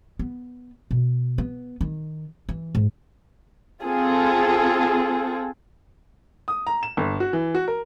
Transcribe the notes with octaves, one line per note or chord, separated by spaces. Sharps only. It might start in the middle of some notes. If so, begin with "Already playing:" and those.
B3
B2
B3
D#3
E3
G#2
C4 F4 G#4 A4
D#6
A#5
E7
G1
F#4
E3
F#4
A#4